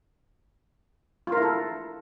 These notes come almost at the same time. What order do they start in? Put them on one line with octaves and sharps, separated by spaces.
F4 A#4 E4 A4